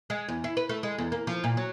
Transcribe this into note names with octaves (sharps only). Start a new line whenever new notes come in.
G#3
E2
E4
B4
A3
G#3
E2
A#3
F3
A#2
F#3